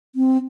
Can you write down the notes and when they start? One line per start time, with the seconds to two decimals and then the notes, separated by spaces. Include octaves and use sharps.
0.15 C4